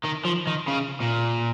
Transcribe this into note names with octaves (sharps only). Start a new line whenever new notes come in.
D#3
F3
D#3
C#3
A#2